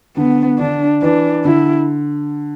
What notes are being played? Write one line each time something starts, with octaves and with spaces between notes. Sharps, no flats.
D3 B3
D3 D4
E3 D4
D3 E4